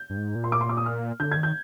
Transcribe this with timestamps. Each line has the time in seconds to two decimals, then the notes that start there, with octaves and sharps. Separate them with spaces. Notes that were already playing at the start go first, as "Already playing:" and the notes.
Already playing: G6
0.10 G2
0.17 G#2
0.35 A#2
0.44 C6
0.52 D6
0.61 C6
0.69 D6
0.77 D#6
0.86 F6
1.20 D3 G6
1.32 G#6
1.37 D#3
1.43 G6